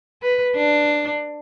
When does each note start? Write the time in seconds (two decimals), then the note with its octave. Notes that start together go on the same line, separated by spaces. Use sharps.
0.22 B4
0.55 D4